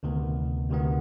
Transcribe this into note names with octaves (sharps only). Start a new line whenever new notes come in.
D2 C3 D#3 B3
D2 C3 D#3 B3